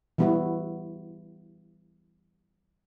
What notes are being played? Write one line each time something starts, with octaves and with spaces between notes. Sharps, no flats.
E3 G3 B3 E4 F#4